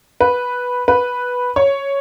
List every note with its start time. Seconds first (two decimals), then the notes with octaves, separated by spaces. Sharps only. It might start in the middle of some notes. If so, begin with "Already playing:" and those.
0.21 B4
0.88 B4
1.56 C#5